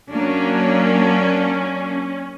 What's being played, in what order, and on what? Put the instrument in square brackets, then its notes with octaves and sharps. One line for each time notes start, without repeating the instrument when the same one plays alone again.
[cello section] F#3 A#3 D4 [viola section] C#4